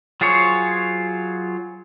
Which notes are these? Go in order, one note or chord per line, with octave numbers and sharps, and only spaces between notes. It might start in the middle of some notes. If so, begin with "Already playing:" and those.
F#3 F4 G#4 C5 C#5